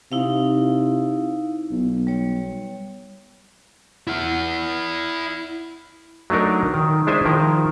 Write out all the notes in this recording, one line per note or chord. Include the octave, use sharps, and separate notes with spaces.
C3 D#4 E4 F5
B1
G3 C#5
E4 F#5
F#3 A3 D4 D#4 A#4
D#3
G#3 D4 E4 C5 E5 G#5
D#3 F3 A#4